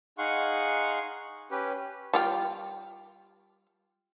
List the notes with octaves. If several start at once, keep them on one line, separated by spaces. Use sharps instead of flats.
D#4 G#4 F5 F#5 C6 C#6
C#4 G4 B4
G3 F4 G5